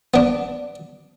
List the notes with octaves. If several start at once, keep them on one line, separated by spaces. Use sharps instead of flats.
B3 D4